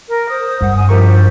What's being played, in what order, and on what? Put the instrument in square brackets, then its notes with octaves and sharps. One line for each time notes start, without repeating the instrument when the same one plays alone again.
[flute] A#4
[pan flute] C5 [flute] D#6
[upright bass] G2 [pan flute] F#5
[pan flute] G#5
[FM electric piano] F3 A#4 C#6 [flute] G4 [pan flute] C5